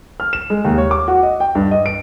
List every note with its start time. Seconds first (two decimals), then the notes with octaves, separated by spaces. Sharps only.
0.20 F6
0.33 E7
0.50 G#3
0.65 D#2
0.78 C#5
0.91 D6
1.08 F#4
1.23 D#5
1.40 G5
1.55 G2
1.71 D#5
1.86 D7